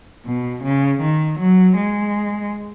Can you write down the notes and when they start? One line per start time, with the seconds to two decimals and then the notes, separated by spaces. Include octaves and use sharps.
0.26 B2
0.63 C#3
1.02 D#3
1.39 F#3
1.76 G#3